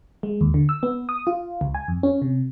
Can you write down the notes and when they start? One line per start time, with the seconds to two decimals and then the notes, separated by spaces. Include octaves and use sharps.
0.23 G#3
0.41 D#2
0.54 D3
0.69 E6
0.83 B3
1.09 D#6
1.27 F4
1.61 C#2
1.75 G#5
1.88 F2
2.03 C#4
2.22 C3